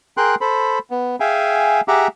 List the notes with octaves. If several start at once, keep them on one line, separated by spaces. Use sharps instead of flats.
G#4 A#4 G5 C6 F#6
A4 C5 B5
B3
G#4 E5 F5 G5 G#5
G4 G#4 E5 F#5 A#5 D6